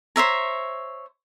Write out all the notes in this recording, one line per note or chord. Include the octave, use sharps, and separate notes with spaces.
C5 C#5 E5 A#5